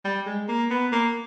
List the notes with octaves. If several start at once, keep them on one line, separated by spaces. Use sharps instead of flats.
G3
G#3
A#3
B3
A#3